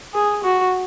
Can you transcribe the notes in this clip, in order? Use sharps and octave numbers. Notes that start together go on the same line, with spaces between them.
G#4
F#4